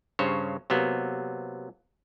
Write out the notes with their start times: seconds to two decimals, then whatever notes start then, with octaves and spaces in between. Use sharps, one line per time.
0.19 G2 C#3 C5 C#5
0.70 C3 F#3 A#3 B3